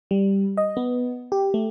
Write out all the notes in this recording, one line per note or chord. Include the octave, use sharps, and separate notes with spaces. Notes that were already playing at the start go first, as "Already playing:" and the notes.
G3
D#5
B3
G4
A3